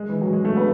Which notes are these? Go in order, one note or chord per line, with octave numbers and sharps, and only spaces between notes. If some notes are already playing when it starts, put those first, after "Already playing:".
Already playing: G#3
E3
F#3
G#3
A3
B3